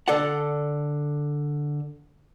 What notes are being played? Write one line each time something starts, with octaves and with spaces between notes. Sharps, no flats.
D3 A4 D5 F#5